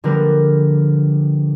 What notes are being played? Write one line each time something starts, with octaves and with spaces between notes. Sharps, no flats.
D3 F3 G3 A#3 A#4 B4